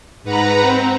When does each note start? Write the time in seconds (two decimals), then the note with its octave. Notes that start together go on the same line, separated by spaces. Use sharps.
0.24 G#2 B4 F#5 A#5
0.62 C4